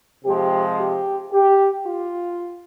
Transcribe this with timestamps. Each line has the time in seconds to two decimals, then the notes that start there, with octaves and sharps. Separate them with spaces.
0.25 C3 F3 G#3 G4
0.79 G4
1.32 G4
1.85 F4